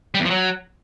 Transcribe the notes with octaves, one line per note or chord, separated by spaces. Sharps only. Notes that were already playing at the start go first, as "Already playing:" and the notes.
G3
E2
F3
F#3